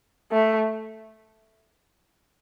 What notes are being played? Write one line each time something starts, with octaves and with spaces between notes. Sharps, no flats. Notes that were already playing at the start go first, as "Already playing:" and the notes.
A3